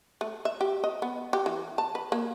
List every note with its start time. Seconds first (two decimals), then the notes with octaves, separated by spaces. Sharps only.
0.21 A3
0.45 E5
0.61 G4
0.84 D#5
1.02 B3
1.33 G4
1.46 E3
1.78 A5
1.95 B4
2.12 A#3